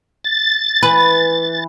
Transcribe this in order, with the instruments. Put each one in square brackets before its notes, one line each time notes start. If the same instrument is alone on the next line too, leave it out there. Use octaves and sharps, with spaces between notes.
[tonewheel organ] A6
[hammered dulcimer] E3 [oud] B4